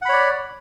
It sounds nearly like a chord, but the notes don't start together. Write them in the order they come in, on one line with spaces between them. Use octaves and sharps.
F#5 B5 C#5 D5